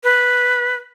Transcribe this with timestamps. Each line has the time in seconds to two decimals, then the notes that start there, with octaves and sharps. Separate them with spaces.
0.04 B4